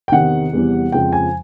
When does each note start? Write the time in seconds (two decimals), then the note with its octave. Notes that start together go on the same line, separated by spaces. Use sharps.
0.08 G5
0.12 E2 C3 D#3 F#5
0.53 E2 C3 E3 G3
0.92 F2 C#3 F3 G#3 G5
1.13 G#5